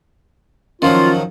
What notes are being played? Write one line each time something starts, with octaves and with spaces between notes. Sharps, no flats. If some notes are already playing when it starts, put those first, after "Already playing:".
D#3 F3 F#3 C#4 F4